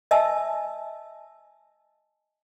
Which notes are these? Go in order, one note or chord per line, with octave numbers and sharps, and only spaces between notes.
D#5 E5 G#5 A5 E6